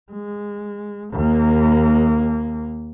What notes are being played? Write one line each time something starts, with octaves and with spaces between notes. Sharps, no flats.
G#3
D#2 A#3